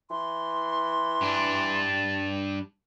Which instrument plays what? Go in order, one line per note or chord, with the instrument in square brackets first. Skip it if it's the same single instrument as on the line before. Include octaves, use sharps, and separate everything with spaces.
[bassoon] E3 [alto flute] C6
[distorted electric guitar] G2 D4 [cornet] A5